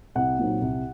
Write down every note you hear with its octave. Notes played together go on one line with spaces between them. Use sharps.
C2 F#5
A#2 F#3 C4 D#4
C2